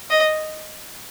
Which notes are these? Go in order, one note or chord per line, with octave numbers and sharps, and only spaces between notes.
D#5